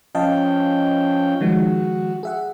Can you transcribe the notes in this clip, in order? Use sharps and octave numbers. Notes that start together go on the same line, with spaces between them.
F3 C#4 D#5 F5 G5 A5
D#3 F3 G#3 F#4
G#4 E5 F#5